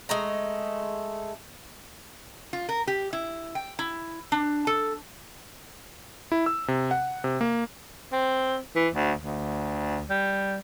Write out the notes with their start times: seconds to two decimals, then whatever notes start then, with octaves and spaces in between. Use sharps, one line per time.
0.09 G#3 A3 A#5
2.53 F4
2.69 A#4
2.87 G4
3.13 E4
3.55 G5
3.79 E4
4.32 D4
4.67 A4
6.32 E4
6.46 E6
6.68 C3
6.91 F#5
7.24 C3
7.41 A#3
8.12 C4
8.75 E3
8.95 D2
9.22 D2
10.10 G3